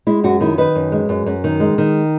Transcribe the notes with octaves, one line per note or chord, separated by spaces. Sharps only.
G#3 E4
F#2 F#4
D#3 E4
D#3 B4
F#2
G#3
F#2
F#2
D#3
G#3
D#3